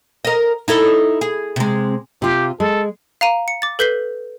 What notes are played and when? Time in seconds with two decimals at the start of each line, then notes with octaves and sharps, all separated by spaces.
0.25 A#4 D#5
0.68 D#4 E4 A4
1.21 G#4
1.56 C3 G#3
2.22 C3 F4 G4
2.60 G#3 A4
3.21 F5 A#5 D#7
3.48 C#7
3.62 D6 A6
3.79 A4 B4 G6 B6 C7 G7